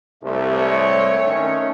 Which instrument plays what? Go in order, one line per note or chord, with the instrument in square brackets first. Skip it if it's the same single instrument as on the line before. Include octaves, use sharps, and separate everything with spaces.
[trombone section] C2 [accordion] A3
[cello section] C#5
[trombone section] D#3 C#4